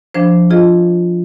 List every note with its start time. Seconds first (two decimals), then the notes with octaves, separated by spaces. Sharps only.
0.14 F3 D4 C5
0.50 F4 G#4 D#5